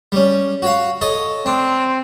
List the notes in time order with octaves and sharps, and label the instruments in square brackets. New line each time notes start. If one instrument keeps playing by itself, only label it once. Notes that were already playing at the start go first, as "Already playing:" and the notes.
[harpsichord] G3 C#4
F#4 C#5 F5
A4 C#5 D#5
[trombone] C4 [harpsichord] D4